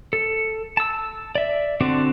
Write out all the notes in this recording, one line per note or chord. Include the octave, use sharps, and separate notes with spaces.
A4
A5 E6
D5 E5
D3 C4 D4 F#4 D5